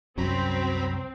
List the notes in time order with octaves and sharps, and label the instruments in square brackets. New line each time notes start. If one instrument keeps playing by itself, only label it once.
[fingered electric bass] C2 F#2 C#4 [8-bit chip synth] F#3 A#5 B5 [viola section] C4